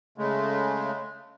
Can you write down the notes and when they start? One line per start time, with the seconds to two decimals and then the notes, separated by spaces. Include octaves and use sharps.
0.18 C#3 G#3 A3